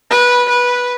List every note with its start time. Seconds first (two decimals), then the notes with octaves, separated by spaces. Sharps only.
0.11 B4
0.49 B4